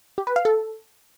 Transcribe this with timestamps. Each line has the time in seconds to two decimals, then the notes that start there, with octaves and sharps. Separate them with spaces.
0.18 G4
0.27 B4
0.36 F5
0.45 A4